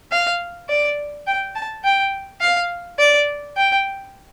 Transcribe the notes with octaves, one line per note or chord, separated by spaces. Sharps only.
F5
D5
G5
A5
G5
F5
D5
G5